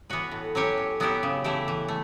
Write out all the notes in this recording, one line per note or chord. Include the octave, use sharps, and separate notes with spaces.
E3 B3 F#4 B4
A2
F#3 C#4 G4 C#5
A2
F#3 B3 E4 G4
C#3
E3 A3 E4 G4
E3
A3